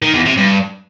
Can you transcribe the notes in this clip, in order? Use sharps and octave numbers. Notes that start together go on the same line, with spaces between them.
D#3
E2
C3
G2